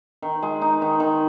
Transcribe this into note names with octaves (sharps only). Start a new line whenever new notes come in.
D#3
G#3
D#4
D#3
D#3